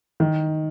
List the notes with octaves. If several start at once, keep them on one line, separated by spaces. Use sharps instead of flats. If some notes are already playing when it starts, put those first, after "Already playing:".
D#3